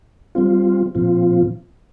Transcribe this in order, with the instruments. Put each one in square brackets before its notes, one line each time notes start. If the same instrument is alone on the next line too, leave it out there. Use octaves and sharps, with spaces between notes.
[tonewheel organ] G3 C4 F4
A#2 F3 C4 F4